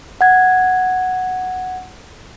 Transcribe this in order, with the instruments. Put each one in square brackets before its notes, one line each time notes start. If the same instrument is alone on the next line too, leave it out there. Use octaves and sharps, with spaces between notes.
[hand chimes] F#5 G#6